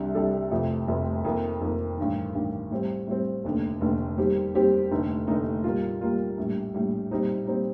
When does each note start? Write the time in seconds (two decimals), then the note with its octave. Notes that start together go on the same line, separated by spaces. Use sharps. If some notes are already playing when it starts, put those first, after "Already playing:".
Already playing: C2 C3 G3 D4
0.14 C2 C3 G3 D4 A4
0.51 F1 F2 C3 F3 A3
0.88 F1 F2 C3 F3 A3
1.24 F2 D#3 A#3
1.61 F2 D#3 A#3
1.97 A1 G2 D#3
2.35 A1 G2 D#3
2.71 A2 G3 C4
3.07 A2 G3 C4
3.44 F1 D#2 D3 A3
3.81 F1 D#2 D3 A3
4.17 D#2 D#3 G3 C4 G4
4.54 D#2 D#3 G3 C4 G4
4.91 F1 D#2 D3 A3 D#4
5.27 F1 D#2 D3 A3 D#4
5.64 A#2 G3 A#3 F4
6.01 A#2 G3 A#3 F4
6.37 A#1 A2 G3
6.74 A#1 A2 G3
7.11 A#2 G3 C4 D#4
7.47 A#2 G3 C4 D#4